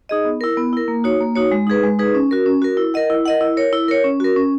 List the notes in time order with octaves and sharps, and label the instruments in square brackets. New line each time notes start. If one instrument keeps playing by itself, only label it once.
[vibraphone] D#4 G#4 D#5
B3
E4 A#4
B3
E4 A#4
A#3
D#4 F#4 C#5
A#3
D#4 F#4 C#5
G#3
D#4 G#4 B4
G#3
D#4 G#4 B4
C#4
F#4 A#4
C#4
F#4 A#4
E4
A#4 D#5 F#5
E4
A#4 D#5 F#5
E4
A#4 C#5
E4
A#4 C#5
C#4
F#4 A#4
C#4